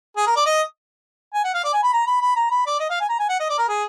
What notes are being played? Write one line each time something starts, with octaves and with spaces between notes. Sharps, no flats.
G#4
A#4
D5
D#5
G#5
F#5
F5
D5
G#5
B5
A#5
B5
B5
A#5
B5
D5
D#5
F5
G#5
A#5
G#5
F#5
D#5
D5
A#4
G#4